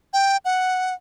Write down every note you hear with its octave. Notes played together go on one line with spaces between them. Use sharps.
G5
F#5